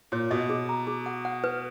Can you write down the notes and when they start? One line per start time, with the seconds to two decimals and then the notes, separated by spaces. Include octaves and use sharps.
0.12 A#2 C#5
0.31 B2 D#5
0.49 G#4
0.69 A#5
0.87 G#4
1.06 F#5
1.25 F#5
1.44 B4